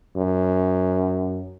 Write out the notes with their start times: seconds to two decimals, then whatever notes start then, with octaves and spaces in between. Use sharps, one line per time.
0.16 F#2